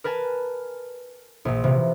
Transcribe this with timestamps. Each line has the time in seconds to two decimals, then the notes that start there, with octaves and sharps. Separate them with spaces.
0.04 A#4 B4 G#5 A5
1.45 A#1 A#2
1.64 C3 E3 F3